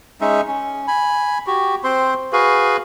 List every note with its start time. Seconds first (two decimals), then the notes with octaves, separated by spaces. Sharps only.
0.21 G#3 C#4 D#4 E5
0.47 C#4
0.87 G#5 B5
1.47 F#4 G4
1.84 C4 C5 C6
2.33 F#4 G#4 B4 F5